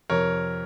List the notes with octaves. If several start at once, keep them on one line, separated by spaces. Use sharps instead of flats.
F2 C3 F3 A#4 C#5